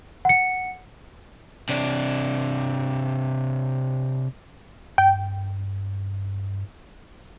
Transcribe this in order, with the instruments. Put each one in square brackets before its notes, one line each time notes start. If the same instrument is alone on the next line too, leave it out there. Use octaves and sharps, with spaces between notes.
[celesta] F#5 C#7
[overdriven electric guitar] C3 D4
[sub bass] G2 [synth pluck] G5